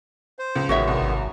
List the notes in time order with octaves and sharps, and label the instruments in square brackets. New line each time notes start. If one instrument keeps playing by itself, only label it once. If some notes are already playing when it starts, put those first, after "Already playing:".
[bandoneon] C5
[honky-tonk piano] C#2
[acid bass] A1 [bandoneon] D#3 G#3 B3 [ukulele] F#4 C#5 E5
[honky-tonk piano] C2
[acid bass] G#1